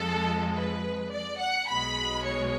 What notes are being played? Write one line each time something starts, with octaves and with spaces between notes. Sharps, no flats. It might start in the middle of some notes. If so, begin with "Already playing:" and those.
Already playing: F2 F3 G#3 A4
B4
D5
F#5
B1 B2 G#3 B5
C#5